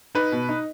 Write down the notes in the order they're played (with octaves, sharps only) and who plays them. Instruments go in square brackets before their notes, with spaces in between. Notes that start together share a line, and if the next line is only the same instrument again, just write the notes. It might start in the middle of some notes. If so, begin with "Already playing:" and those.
[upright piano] D#4 B4
B2
D#4